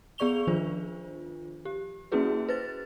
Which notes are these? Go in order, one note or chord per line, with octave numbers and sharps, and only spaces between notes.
B3 G#4 D5 C#6 F7 G7
D#3 F3 D4 F4 C5
G4
A#3 C#4 E4 F#4 G#4 B4
B4 C5 A6